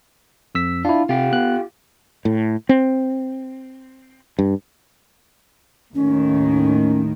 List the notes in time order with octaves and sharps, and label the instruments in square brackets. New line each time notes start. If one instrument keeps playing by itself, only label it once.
[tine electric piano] F2 E6 B6
[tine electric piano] D4 E4 [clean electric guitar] F4
[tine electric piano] C3 [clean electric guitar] F4 G4
[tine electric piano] B3 F#6
[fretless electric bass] A2
C4
G2
[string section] D#2 A2 D#3 [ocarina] C#4